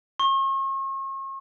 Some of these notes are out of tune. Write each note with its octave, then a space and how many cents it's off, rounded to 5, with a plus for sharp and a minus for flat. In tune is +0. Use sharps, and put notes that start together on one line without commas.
C#6 -40